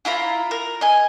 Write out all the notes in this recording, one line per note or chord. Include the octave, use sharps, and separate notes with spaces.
E4 F4 A#5 B5
A#4
D#5 G#5